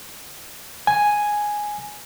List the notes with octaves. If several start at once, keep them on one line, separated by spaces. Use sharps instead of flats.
G#5